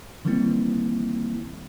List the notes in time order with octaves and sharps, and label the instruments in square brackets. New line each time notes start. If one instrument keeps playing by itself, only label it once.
[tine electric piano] D#3 E3 G3 A#3 C4 E4